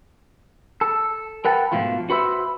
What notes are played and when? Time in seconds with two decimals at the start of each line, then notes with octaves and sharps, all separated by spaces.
0.81 A4
1.45 A#4 B4 F#5 G5 A5
1.72 G#2 B2 F3 A3 F4
2.10 F#4 B4 C5 E5